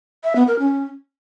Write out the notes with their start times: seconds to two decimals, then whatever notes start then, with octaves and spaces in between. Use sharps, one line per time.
0.24 E5
0.36 B3
0.48 A#4
0.59 C#4